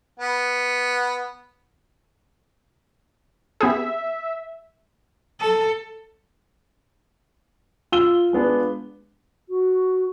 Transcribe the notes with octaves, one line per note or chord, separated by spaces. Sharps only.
B3
B3 G4 G#4 E5
A4
F4 E6 G7
G#3 B3 D4
F#4